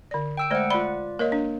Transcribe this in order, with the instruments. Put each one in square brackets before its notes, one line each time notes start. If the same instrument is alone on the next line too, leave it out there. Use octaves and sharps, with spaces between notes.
[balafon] D3 D5
[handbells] G5 E6 D7
[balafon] G#3 C5 D5 [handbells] A3 F#5
[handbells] F4 D5 [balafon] B5
[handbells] A#3 [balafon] A#4 C#5 D#5
[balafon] D4